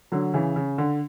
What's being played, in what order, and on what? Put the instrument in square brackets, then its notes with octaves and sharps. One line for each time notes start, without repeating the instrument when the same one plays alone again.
[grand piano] D3 F#3
C#3 E3
C#3
D3